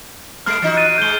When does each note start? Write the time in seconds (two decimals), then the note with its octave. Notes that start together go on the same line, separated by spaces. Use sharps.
0.46 G3 A3 B3 F6 C7 D7
0.62 E3 D#4 F#4
0.77 F#6 A6 D#7
0.98 G#2 G#3 G6 G7